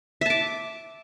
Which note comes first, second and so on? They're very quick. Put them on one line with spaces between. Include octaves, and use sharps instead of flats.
E5 A5 D6